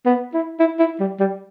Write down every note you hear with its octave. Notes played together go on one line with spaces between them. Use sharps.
B3
E4
E4
E4
G3
G3